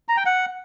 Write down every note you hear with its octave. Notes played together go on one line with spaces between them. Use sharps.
A#5
G5
F#5